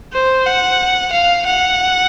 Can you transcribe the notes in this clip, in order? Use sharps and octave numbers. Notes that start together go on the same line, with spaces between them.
C5
F#5
F5
F#5